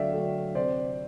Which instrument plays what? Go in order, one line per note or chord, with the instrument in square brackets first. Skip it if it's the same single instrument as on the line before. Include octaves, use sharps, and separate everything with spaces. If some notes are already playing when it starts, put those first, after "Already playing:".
Already playing: [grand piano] D3 F#3 A3 D5 E5 F5 G5
D3 F#3 A3
C3 C5 D5